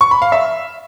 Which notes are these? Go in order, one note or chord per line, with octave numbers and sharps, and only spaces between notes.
C#6
B5
F5
E5